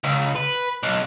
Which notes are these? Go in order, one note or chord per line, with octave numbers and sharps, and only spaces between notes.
C#2
B4
B1